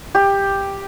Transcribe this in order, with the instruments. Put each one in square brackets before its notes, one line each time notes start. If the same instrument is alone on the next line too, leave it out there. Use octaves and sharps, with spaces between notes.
[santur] G4